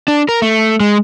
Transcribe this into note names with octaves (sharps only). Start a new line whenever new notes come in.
D4
A#4
A3
G#3